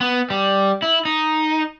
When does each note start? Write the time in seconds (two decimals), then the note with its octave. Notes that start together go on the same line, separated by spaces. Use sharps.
0.01 B3
0.30 G3
0.82 E4
1.05 D#4